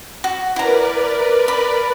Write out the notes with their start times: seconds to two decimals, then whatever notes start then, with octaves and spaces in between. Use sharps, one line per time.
0.24 F#4
0.56 E4 A#4 B4 D5 A#5
1.48 B5